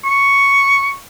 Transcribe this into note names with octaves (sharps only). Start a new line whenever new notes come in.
C#6